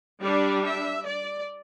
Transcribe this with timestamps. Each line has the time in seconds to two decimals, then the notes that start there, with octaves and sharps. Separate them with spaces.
0.22 G3 D4 D5
0.63 E5
1.05 D5